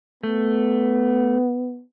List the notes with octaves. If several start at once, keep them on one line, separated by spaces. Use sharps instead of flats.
A3 B3